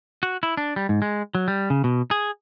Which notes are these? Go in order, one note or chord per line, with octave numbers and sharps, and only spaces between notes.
F#4
E4
D4
G3
G#2
G#3
F#3
G3
C#3
B2
G#4